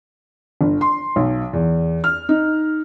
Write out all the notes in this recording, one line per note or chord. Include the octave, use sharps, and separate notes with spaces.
G1
C6
B1
E2
F6
D#4